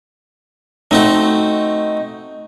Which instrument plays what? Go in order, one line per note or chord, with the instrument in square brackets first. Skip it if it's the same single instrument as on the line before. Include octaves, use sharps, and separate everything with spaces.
[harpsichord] A3 C4 F#4 [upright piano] D#4